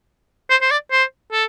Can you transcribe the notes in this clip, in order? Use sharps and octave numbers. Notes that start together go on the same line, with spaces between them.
C5
C5
D5
C5
A4